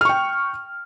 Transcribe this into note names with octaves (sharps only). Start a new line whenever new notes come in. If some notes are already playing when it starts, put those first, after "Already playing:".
G5 C#6 F6